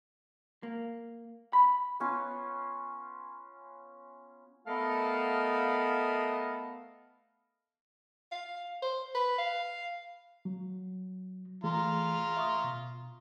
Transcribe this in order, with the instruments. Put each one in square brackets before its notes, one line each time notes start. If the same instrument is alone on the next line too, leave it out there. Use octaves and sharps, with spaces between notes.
[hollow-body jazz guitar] A#3
B5
[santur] B3 C#4 F4
[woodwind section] A3 B3 A4 A#4 D#5 F5
[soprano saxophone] F5
C5
B4
F5
[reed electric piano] F#3
[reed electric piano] E3 A3 G#4 [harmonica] F4 A#5
[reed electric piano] E5 C#6 D#6
B2